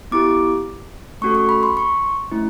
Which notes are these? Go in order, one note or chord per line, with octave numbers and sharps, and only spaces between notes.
B3 E4 G4 D6
A3 C#4 F#4 A4 C#6
C#6
B5
C6
C#6
A3 C#4 E4